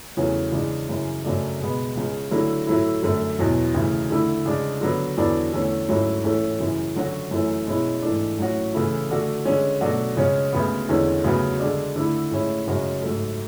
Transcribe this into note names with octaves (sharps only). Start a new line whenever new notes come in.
E2 C#3 F#3 A3 C#4
C#3 E3 G#3 D4
F#2 C#3 E3
F#2 C#3 F#3 A3 D4
B2 G#3 B3
C#2 C#3 G#3
D3 F#3 A3 E4
A2 F#3 A3 E4
F#2 D3 A3
E2 B2 F#3
D2 C#3 E3
D3 A3 E4
C#3 G#3 D4
D3 F#3 B3
E2 D3 F#3 B3 D4
E2 D3 A3 C#4
G#2 F#3 A3 C#4 E4
A2 E3 A3 C#4
F#2 C#3 E3
D3 F#3 C#4 F#4
F#2 E3 A3 C#4
B2 G#3 C#4 E4
G#2 E3 A3 D4
A2 F#3 C#4 F#4
C#3 E3 A3 E4
D3 A3 D4 F#4
D3 G#3 C#4
B2 F#3 A3 D4 F#4
C#3 G#3 C#4
D2 C#3 G#3 B3
E2 D3 G#3 C#4
D2 C#3 F#3 B3 F#4
D3 G#3 D4
D3 A3 E4
A2 G#3 C#4 E4
F#2 C#3 G#3 C#4 F#4
G#2 F#3 A3